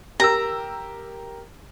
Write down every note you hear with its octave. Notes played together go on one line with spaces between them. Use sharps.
G4 A#4 A#5 E6